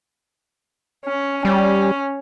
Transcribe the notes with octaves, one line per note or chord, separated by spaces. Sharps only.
C#4
G3 C#4